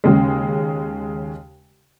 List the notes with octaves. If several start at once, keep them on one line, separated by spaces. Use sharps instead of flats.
D#2 C#3 G#3